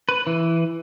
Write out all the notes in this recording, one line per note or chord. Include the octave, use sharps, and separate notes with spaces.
B4
E3